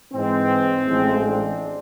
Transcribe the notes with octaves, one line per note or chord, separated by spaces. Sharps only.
G#2 E3 G#3 C4
A1 A2 F3 G#3
D4